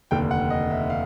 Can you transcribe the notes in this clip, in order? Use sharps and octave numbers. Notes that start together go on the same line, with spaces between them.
F1 D#2 D3 G5
F#5
D#5
E5
F5